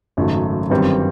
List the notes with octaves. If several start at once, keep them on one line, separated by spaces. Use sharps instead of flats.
G#1 F#2 C#3 F#3 A3
G1 F#2 D#3 G3 C4